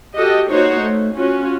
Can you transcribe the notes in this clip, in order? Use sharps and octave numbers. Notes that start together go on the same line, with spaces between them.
F#4 G4 A4 D#5
A#3 D#4 F#4 C5 C#5
A3
C#4 F4 F#4